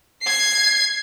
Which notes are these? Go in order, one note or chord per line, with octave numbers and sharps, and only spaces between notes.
G#6 C7